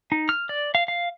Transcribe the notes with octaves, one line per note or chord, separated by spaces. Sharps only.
D#4
F6
D5
F5
F5